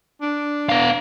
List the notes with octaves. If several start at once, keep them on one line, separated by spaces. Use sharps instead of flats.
D4
B3 F5